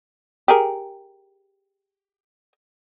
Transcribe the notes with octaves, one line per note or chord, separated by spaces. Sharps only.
G4 G#4 A#4